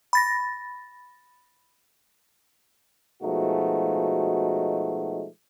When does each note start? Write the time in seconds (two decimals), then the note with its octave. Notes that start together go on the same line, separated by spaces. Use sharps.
0.13 B5 A6 A#6
3.22 B2 F3 G#3 A3 D#4 F#4